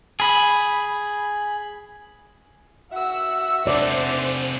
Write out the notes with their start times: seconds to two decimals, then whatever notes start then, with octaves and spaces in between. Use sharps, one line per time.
0.20 G#4 B5
2.92 F#4 E5 F#5 E6
3.67 C3 A4 C5 D5